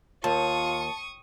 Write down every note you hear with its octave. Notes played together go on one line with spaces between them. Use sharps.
D#2 F4 A5 C#6 D#6